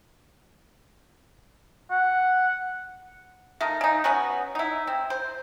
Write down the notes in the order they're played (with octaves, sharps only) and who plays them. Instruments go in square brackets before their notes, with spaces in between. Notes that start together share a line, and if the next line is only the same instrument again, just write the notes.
[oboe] F#5
[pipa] A3 D#4 A#4
C#3 D#4
B3 C#4 F#4
D#4 E4
C4
C5